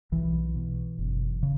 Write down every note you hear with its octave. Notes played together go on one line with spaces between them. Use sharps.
B1 E3
B2
F#1
C#3